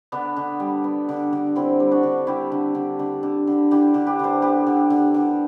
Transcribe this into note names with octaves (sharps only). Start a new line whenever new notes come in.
D3 B3 D4
D3
G3
B3
D3
D3
D3 C4 E4
G3
D4 F#4
D3
D3 E4 G4
D3
D3
D3
D3
D3
D3 E4 G4
D3
G4 B4
D3 A4 C5
B3 G4 B4
D3
D3
D3